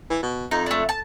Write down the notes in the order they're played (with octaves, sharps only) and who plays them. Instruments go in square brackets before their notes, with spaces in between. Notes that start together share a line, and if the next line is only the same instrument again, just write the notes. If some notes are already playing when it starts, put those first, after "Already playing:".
[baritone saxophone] E3
B2
[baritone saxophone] F2 [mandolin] D#4
[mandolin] A3 D4
A5